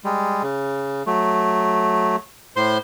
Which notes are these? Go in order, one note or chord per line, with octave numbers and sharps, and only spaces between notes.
G3 G#3
C#3
F#3 A3
A2 C5 C6